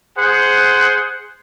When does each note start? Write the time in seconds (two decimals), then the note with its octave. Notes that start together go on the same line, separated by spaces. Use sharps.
0.17 G#4 C5 F#5